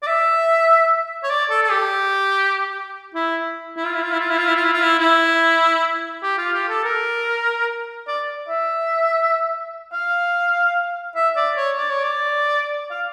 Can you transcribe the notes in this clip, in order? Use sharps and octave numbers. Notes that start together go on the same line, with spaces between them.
D5
E5
C#5
D5
A4
A4
G4
E4
E4
F4
E4
F4
E4
F4
E4
F4
E4
F4
E4
F4
E4
E4
G4
F4
G4
A4
A#4
D5
E5
F5
E5
D5
C#5
D5
C#5
D5
F5